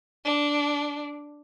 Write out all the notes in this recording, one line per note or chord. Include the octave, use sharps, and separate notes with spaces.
D4